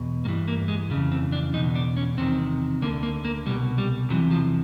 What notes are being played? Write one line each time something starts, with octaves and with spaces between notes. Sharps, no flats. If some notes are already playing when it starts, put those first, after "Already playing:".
Already playing: E2 B2
G2 E3 A#3
A#3
G#3
F2 C#3 E3
C4
D4
E2 B2 D#4
D4
C#4
E2 C3 D#3 C4
D2 D3 A#3
A#3
A#3
C2 B2 G3
G3
E2 C3 E3 F#3
F3